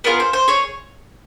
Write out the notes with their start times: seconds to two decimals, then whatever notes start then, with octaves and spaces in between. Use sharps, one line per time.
0.04 B3 D4 F4 G#4 A#4
0.20 C5
0.33 C5
0.48 G#4 C#5